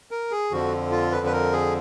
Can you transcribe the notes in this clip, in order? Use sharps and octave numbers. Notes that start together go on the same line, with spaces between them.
A#4
G#4
F2 D3 F3 F#4
F4
B4
B4
A#4
G#4